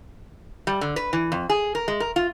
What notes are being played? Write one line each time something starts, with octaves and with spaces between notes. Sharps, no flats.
G3
D3
B4
E3
F2
G#4
A#4
G#3
A#4
F4